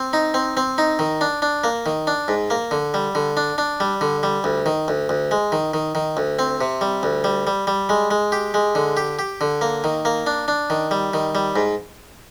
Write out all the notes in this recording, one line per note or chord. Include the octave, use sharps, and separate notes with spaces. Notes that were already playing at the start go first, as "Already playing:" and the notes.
Already playing: C4
D#4
C4
C4
D#4
D#3
D4
D4
A#3
D#3
D4
G#2
A#3
D3
G3
D3
D4
D4
G3
D3
G3
D2
D#3
D2
D2
G#3
D#3
D#3
D#3
D2
C4
C3
G3
D2
G3
G3
G3
G#3
G#3
G4
G#3
D3
G4
G4
D3
A#3
D#3
A#3
D4
D4
D#3
G3
D#3
G3
G#2